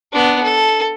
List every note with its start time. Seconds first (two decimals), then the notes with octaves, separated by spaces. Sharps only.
0.12 B3 D4
0.43 A4